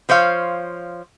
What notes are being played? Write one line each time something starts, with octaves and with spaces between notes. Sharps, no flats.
F3 C5 C#5 F5